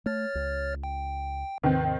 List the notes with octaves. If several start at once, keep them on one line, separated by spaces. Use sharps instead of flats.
A3 C#5 F6 A6
C#2
G5
D#2 G#2 C3 D#3 C4 B4